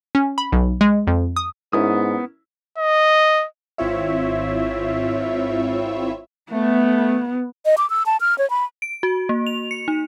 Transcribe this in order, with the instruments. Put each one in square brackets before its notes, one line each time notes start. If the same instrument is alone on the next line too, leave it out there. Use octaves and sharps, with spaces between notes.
[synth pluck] C#4
B5
B1
G#3
F2
D#6
[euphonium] G#2 [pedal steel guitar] B3 D#6 [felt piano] C#4 E4 A#4
[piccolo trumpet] D#5
[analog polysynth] G#1 C4 E4 F4 C#5 E5
[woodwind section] A3 [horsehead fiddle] B3
[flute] D#5
D6
E6
A5
F6
C#5
B5
[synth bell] D7
F#4
A#3
F7
C#7
D#4